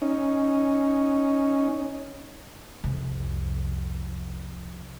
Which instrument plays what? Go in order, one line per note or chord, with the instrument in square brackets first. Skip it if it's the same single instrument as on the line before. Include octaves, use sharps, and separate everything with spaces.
[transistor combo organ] C#4 D#4
[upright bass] C2 F2